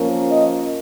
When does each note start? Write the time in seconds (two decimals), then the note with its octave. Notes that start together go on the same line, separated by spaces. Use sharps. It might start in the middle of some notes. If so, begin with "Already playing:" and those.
Already playing: F3 A#3 C#4
0.30 D#5